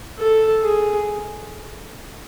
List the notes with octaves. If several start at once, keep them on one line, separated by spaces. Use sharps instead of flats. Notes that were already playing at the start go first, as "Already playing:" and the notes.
A4
G#4